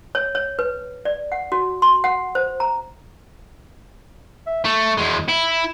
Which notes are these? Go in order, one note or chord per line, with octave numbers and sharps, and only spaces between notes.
C#5
C#5
B4
D5
F#5
F#4
C6
F#5
C5
A#5
E5
A3 C#6
E2 G#3 C6
E4 B5